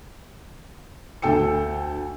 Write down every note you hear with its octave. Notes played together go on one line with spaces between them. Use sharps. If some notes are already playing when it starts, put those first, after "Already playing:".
D2 A4 G5 E6 C#7